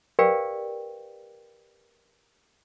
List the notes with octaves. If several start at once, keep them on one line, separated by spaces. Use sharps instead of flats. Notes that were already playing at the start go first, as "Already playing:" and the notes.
G4 A#4 B4 D5 F5 G5